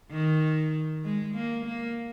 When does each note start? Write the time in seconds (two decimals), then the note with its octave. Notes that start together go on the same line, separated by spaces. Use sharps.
0.11 D#3
1.04 G#3
1.35 A#3
1.65 A#3